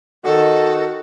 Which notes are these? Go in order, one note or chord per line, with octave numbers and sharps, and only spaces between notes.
D#3 F#4 A4